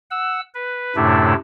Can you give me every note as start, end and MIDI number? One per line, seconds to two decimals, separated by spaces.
0.11 0.41 78
0.11 0.41 88
0.54 0.96 71
0.96 1.34 42
0.96 1.34 45
0.96 1.34 48
0.96 1.34 57
0.96 1.34 62
0.96 1.34 64